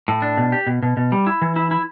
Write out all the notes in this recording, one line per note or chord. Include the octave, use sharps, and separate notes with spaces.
A2
D4
B2
G4
B2
B2
B2
G3
E4
E3
E4
E4